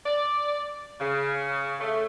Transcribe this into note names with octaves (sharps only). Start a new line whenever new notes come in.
D5
C#3
A3